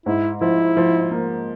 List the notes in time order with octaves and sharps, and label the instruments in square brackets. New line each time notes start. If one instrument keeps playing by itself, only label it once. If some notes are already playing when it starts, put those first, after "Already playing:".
[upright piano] G#2 [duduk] E4
[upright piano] F3 [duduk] E4
[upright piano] F3
A#3